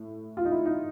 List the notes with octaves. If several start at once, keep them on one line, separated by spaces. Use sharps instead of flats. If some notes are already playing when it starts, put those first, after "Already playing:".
Already playing: A2
F4
D#4
E4
D#4